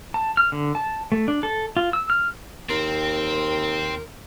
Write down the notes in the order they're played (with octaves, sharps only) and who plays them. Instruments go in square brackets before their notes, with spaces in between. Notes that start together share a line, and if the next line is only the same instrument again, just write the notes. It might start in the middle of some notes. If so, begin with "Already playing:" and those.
[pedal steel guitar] A5
F6
D3
A5
A3
D4
A4
F4
E6
F6
[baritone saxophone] D#2 [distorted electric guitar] C4 [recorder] A#4